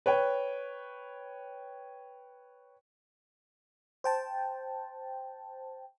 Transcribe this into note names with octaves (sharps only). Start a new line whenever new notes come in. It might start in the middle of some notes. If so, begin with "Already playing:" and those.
B4 C#5 G5
C5 G5 A5